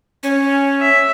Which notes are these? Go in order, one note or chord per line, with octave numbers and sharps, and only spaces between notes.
C#4
E5